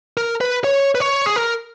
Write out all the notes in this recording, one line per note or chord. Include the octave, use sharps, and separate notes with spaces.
A#4
B4
C#5
B4
C#5
G#4
A#4